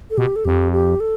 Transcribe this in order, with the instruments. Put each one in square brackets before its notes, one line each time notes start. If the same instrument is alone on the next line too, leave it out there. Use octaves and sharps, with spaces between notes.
[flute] A4
[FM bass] B2 [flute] G4
[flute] A4
[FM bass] F2 [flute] G4
[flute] G4
A4